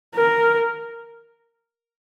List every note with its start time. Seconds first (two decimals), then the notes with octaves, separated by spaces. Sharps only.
0.15 A#4